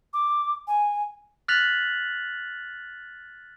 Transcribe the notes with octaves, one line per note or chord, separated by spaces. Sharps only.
D6
G#5
F6 F#6 A6 B6 F7 F#7